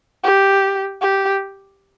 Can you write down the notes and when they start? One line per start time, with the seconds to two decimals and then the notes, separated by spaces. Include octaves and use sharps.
0.24 G4
1.01 G4